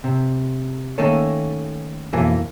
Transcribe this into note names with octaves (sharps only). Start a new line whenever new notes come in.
C3
D#3 A3 A#3 C#4 A4 C#5
B1 F2 E3 A#3 A4 G#5